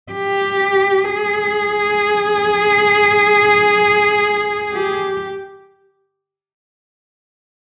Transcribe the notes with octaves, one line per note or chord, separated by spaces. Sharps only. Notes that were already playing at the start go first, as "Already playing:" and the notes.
G4
G#4
G4